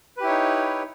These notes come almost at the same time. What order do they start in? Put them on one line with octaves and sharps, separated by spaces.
B4 G4 E4 C#5 D#4